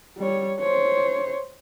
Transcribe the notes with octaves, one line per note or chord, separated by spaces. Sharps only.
G3 C#5
C5 C#5